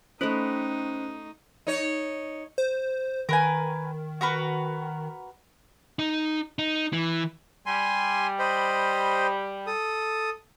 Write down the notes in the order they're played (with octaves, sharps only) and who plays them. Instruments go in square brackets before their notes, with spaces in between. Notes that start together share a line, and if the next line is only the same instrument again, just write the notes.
[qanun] A3 D#5 B5 [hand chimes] C#4 C5 [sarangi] D#4
[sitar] D#4 C#5
[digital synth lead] C5
[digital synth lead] D#3 [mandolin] A#4 B4 G#5
[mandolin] F#4 A#4 B4
[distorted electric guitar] D#4
D#4
E3
[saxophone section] G3 [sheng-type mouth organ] G#5 C6
[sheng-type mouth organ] C5 D#5 B5
A4 D#6